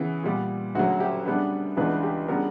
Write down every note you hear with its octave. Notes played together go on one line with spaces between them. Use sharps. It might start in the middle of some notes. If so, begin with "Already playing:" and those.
Already playing: C#3 E3 B3
A#2 G3 B3
D2 C#3 F#3 F#4
G4
C#3 G3 B3 D4 B4
C#2 C#3 E3 B3 D4 B4
G4
C#3 G3 B3 D4 A#4